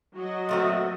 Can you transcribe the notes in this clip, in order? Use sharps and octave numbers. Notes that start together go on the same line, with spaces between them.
F#3 F#4 D#5
A#2 A3 C4